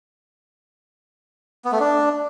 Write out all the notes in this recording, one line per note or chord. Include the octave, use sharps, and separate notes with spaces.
B3
A3
D4